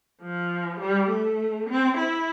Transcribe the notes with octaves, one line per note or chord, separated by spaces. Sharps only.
F3
G3
A3
C4
E4